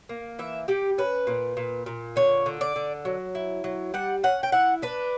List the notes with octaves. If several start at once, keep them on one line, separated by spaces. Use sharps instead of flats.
A#3
E3 E5
G3 G4
C#4 B4
A#2
A#2
A#2
D3 C#5
D3
D5
D3
F#3
E4
F#3
G3 F#5
C#4 F#5
G5
E4 F#5
D4 B4